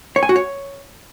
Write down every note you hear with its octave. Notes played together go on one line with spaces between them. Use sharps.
C#5
G#5
F#4
C#5